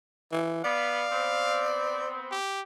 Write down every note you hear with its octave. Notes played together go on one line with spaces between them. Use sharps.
E3
B3 D5 F5
B3 C4
G4